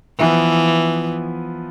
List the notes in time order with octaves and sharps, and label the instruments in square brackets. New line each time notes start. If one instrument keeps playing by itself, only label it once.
[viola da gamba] E3 [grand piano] F3 B3 E4 B4